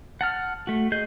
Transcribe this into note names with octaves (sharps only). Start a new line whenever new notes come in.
F#5 A5 F6
A3 F#4
G#4 D#5 G6